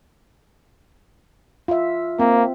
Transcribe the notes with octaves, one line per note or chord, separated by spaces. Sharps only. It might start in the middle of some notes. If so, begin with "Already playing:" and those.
F4 E5
A#3 C4